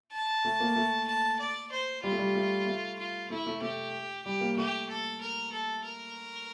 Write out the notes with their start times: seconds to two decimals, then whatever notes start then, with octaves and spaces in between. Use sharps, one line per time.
0.12 A5
0.45 A3
0.60 A#3
0.76 A3
1.08 A5
1.40 D5
1.72 C5
2.03 G3 F4
2.12 A3
2.19 G3
2.35 A3
2.66 A3
2.99 F4
3.30 A3 E4
3.46 A3
3.62 A3 G4
4.25 G3 G4
4.41 A#3
4.57 A3 G4
4.89 A4
5.20 A#4
5.52 A4
5.84 A#4